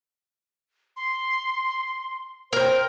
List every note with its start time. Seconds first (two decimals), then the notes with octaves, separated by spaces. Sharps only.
0.96 C6
2.53 A#4 C5 G5